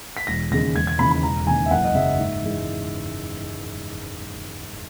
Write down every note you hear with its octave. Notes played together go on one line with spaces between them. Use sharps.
B6
E1 A#6
D#2 C#3 G#3 A#6
E1 G#6
G#6
D#2 C#3 E3 B5
B5
E1 A#5
D#2 C#3 G#5
E5
F#1 F#5
D#5
F#2 C#3 E5
G#2
E3 G#3